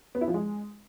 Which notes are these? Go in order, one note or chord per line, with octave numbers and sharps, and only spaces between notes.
B3
E4
F3
G#3